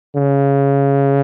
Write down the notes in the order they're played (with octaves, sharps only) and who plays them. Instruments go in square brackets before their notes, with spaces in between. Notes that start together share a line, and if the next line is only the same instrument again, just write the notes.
[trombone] C#3